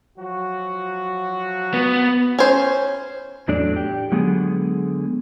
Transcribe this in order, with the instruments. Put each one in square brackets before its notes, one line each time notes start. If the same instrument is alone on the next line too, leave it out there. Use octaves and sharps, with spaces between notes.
[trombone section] F3 F#3 F#4
[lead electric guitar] B3
[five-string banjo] C#4 C5
[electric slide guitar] E2 A2 F#3 D4 A4 D5
G4
D3 F#3 G#3 B3 G#4